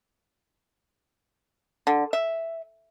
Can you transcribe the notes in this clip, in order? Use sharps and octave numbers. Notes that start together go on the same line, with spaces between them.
D3
E5